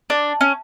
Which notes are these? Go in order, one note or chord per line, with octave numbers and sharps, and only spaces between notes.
D4
C#4